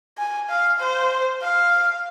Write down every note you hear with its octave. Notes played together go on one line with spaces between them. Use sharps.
G#5
F5
C5
F5